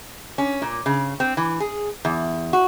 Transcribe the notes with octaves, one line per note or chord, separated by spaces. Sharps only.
C#4
A#2
C#3
C4
E3
G#4
E2
F#4